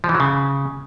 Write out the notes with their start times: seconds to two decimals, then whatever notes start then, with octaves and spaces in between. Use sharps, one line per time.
0.04 F3
0.09 E3
0.14 F#3
0.20 C#3